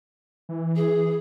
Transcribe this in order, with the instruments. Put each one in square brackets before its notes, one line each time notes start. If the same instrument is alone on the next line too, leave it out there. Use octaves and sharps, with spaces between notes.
[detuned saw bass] E3
[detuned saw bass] E3 [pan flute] G#4